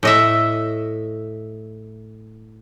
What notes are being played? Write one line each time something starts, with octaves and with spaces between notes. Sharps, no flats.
A2 D#5 E5